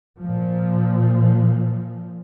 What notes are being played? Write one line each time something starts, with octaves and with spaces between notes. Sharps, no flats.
A#2 F3